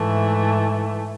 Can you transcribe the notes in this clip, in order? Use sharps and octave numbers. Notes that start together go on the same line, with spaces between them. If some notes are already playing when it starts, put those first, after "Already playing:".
Already playing: G#2 E3 A3